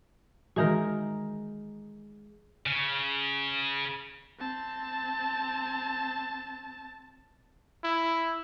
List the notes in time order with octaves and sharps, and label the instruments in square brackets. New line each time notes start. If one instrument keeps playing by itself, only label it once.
[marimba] D#3 E3 F#4 [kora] G#3 D#4 A#4
[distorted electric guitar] C#3
[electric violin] C4 A5
[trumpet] E4